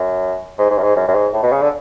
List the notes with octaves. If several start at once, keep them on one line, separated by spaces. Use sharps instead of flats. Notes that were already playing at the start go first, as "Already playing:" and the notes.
Already playing: F#2
G#2
G#2
F#2
G#2
F#2
F#2
G#2
A2
B2
C#3
D3